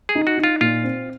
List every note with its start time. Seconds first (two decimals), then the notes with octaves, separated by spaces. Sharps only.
0.09 G#4
0.15 D#4
0.27 F#4
0.38 D#4
0.44 F4
0.61 A#2 F4
0.84 C4